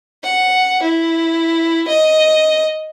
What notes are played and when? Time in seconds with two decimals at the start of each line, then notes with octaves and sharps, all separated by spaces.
0.23 F#5
0.82 E4
1.88 D#5